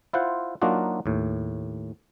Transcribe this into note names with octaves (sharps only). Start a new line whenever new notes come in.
E4 F4 C5 F#5
F#3 A#3 D4 D#4 F4 F#4
D#2 A2